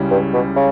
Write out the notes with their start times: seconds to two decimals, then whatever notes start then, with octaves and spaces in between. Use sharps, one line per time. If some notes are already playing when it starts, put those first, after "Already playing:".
Already playing: C#2 C#3 G3 C#4 E4
0.11 G2
0.33 B2
0.56 C#3